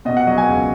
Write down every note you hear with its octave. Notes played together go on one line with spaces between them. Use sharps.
B2 D#5
F#5
F#3 D#5
G#5
C#2